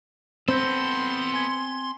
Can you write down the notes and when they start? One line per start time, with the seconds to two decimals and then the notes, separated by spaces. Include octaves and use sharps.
0.48 B3 C4 A4 B5 C6 G6 A#6
1.33 G#5 G#6